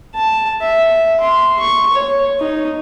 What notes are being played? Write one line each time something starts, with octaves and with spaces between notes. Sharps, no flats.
A5
E5
C6
C#6
C#5
D#4